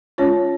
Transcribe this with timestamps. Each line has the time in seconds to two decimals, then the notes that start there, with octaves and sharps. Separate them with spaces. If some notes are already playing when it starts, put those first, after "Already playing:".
0.18 G#3 C#4 F4 C#5